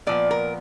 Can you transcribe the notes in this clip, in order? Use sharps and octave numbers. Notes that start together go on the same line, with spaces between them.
A#2 F3 B3 D5
A#4